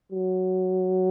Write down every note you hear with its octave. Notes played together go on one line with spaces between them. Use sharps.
F#3